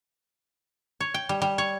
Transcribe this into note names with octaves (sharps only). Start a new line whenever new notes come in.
C#5
G5
G3
G3
C#5